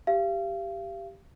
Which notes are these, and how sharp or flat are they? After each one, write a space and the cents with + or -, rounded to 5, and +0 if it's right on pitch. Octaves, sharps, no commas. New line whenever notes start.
G4 +0 F5 -35